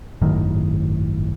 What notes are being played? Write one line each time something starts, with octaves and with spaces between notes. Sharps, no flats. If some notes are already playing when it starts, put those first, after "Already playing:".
G#1 F#2 A2 D#3